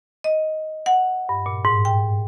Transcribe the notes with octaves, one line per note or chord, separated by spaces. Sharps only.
D#5
F#5
G2
A#2
G#2
G5